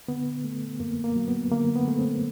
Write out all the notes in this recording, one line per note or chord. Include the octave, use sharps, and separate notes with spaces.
D3 B3
A3
F#2 A#3
A#3
F#3
B3
D3 A#3
B3
A3
C4